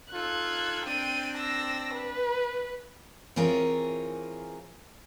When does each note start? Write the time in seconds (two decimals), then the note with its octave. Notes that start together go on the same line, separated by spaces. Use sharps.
0.13 D#4 F4 A4 F#6 G#6
0.85 C4 D4 G5 D#7
1.36 E6 A#6
1.94 B4
3.36 E3 C4 F4 G#4 A#4 C#5